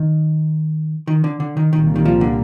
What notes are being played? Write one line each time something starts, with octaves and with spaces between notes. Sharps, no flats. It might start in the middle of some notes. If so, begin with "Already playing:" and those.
Already playing: D#3
D#3
D3
D3
D#3
C2 A#2 D#3 G3 A#3
D#3
F3
D3